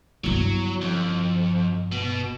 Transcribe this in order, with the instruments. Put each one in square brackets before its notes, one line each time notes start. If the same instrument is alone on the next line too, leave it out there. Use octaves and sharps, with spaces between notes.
[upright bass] G1 E4 [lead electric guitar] F#3
[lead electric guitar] F2
B2